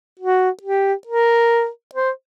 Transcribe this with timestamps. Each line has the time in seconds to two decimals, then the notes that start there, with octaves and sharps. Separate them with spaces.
0.19 F#4
0.62 G4
1.07 A#4
1.95 C5